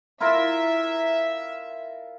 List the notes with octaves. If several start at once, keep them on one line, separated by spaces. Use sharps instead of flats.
E4 F4 A#4 E5